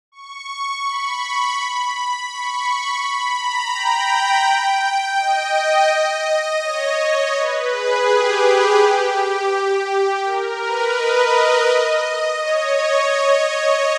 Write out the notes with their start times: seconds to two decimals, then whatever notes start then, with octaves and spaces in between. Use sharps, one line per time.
0.12 C#6
0.83 B5
2.28 C#6
3.00 B5
3.36 A#5
3.73 G5
5.18 D#5
6.62 C#5
6.98 C#5
7.34 B4
7.70 G#4
8.06 G4
10.23 A#4
10.60 B4
10.95 D#5
12.41 C#5